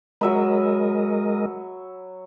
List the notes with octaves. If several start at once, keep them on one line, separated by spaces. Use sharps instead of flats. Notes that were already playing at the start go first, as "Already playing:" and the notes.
F#3 G#3 A#4 D#5 E5 B5